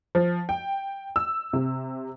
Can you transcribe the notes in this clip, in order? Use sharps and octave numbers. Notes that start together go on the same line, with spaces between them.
F3
G5
E6
C3